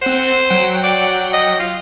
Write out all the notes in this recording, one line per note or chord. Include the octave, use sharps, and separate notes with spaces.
C4 C5 F#5
F#3 F#5 G5
D5
D#5
F4